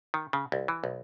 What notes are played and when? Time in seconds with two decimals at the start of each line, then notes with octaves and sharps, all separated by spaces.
0.14 D#3
0.33 C#3
0.52 C2
0.68 E3
0.84 B1